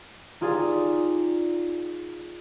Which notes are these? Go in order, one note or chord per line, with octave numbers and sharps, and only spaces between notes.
D#4 F4 G4 G#4 D5